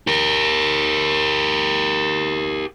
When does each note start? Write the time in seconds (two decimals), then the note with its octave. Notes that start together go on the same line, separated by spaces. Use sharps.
0.07 G4 A#4